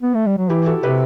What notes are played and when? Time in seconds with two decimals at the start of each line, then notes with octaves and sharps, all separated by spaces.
0.02 B3
0.14 A3
0.26 G3
0.38 F#3
0.50 E3 E4 G4
0.66 F#4 A4
0.83 C3 G4 B4